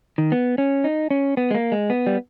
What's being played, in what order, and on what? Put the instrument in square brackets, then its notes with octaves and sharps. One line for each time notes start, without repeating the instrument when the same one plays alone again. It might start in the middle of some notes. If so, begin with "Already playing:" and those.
[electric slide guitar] D#3
B3
C#4
D#4
C#4
B3
G#3
A#3
G#3
B3
G3